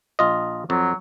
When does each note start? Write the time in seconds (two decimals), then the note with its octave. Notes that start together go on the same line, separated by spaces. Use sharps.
0.19 A#1 F4 D#5
0.70 F2 F#3